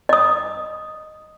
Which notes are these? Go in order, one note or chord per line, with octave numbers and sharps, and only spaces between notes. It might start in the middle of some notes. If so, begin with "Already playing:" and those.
D#5 D#6